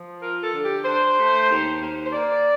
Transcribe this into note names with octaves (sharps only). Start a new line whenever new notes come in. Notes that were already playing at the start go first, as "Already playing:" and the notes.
Already playing: F3
F4 A#4
A4
D3
G4
D4 C5
A3
D#2
D#2
C5
A#3 D5